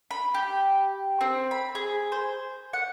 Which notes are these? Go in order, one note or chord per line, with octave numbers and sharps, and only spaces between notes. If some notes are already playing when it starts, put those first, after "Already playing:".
B5
G4
C4
B5
G#4
C5
F#5